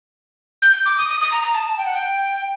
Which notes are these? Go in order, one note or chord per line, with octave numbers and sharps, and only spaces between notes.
G6
D6
D#6
D#6
D#6
A#5
A#5
A5
G5
F#5
G5